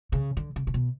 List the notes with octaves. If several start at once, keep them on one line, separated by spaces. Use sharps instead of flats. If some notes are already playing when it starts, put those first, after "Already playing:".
C#3
D3
C#3
C3
B2